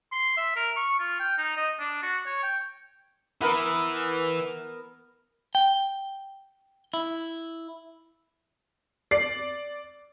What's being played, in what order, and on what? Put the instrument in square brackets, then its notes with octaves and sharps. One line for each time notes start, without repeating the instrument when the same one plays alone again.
[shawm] C6
E5
A#4
C#6
F4
G5
D#4
D#5
D4
F#4
C#5
G5
[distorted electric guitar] E3 [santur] B3 A#4
[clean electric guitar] G5
E4
[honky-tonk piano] D5 C7